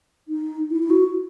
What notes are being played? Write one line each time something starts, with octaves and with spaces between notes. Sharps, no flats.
D#4
E4
E4
F#4